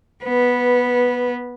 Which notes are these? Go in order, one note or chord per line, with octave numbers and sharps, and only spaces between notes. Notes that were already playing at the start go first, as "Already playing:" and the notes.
B3 B4